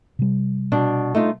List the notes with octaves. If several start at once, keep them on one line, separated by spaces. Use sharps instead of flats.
C3 G3
B2 D4
A3 D#4 F4